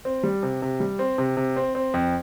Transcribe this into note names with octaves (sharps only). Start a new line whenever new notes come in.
C4
G3
C3
C3
G3
C4
C3
C3
C4
C4
F2